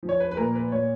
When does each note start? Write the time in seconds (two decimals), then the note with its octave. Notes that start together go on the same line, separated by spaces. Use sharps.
0.03 F3
0.09 C#5
0.20 B4
0.31 B4
0.37 A#2 A#4
0.55 B4
0.72 A#2 C#5